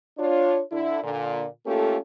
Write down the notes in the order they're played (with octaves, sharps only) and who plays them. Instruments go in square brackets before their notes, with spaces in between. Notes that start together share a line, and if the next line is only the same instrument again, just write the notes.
[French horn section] D4 F4 C#5
D3 E4
A#2 D3
A3 A#3 C#4 F4 G4 A4